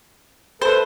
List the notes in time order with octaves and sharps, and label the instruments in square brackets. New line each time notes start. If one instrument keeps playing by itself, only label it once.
[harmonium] A3 A4 B4 [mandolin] C5